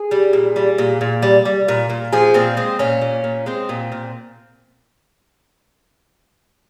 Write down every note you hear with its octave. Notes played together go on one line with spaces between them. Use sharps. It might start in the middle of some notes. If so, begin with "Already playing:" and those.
Already playing: G#4
G3
A#2
G3
A#2
A#2
G3
G3
A#2
A#2
F3 G#4
A#2 C4
G#3 C4
A#2 C#4
A#2
A#2
G#3 C4
A#2
A#2